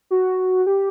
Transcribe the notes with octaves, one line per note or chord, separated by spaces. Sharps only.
F#4
G4